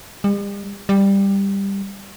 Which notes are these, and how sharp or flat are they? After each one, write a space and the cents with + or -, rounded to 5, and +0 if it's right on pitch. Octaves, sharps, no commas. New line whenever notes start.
G3 +45
G3 +10